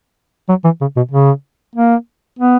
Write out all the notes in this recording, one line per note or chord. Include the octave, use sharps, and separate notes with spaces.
F#3
E3
C#3
B2
C#3
A#3
B3